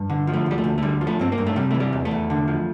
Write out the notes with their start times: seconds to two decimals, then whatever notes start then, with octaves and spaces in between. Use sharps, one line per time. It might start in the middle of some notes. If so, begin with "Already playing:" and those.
Already playing: G2
0.10 D3
0.27 F3
0.34 A3
0.46 D2 G3
0.58 A3
0.64 D2
0.78 A3
0.82 D3 G3
1.01 F3
1.07 A3
1.19 G2 C4
1.32 A#3
1.38 G2
1.47 A3
1.56 C3 G3
1.71 E3 A3
1.80 G3
1.93 E2
2.05 A3
2.11 E2
2.30 D3
2.48 F3